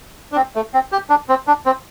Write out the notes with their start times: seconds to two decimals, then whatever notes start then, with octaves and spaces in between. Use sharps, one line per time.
0.32 D4
0.36 C4
0.56 A3
0.74 C4
0.92 G4
1.10 D4
1.29 C4
1.47 D4
1.66 C4